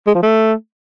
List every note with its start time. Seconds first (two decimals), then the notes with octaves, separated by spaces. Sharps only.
0.07 G#3
0.15 F3
0.23 A3